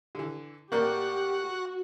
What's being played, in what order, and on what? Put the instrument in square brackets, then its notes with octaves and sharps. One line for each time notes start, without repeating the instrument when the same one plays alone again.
[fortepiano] D3 E3
[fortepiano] A2 A#3 D5 [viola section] G4 [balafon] A#4 [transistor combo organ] F#5 C#6
[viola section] F#4